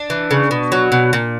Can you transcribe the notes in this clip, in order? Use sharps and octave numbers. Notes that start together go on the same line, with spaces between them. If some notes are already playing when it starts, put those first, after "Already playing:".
Already playing: D4
E3
C#3
B2
F#3
B2
A#2